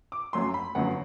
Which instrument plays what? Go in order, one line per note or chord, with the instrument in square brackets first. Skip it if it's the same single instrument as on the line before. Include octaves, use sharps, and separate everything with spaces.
[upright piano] D6
F#2 F#3 A3 C6
B5
G1 F#2 D3 F#3 F#5